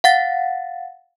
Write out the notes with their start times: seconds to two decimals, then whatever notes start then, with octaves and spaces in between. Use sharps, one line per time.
0.04 F5 F#5 A6